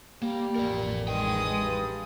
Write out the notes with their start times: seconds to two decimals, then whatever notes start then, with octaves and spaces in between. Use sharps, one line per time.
0.22 G3 A#3
0.56 A1 F2 A#4 D5
1.08 D#3 G#3 B4 G5 D#6
1.60 G2